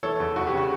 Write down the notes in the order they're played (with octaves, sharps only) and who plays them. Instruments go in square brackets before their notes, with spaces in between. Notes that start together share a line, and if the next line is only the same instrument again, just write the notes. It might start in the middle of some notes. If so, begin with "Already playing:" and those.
[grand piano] E3 A4 C#5
E2
E2 F#4
G4
C#3 F#4